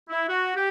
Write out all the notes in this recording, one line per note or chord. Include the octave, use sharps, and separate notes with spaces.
E4
F#4
G4